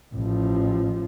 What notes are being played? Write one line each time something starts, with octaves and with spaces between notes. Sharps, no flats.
A1 F3